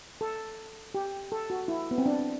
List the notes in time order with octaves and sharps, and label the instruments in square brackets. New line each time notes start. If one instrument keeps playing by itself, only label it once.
[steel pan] A4
G4
A4
F#4
E4
B3
C4
D4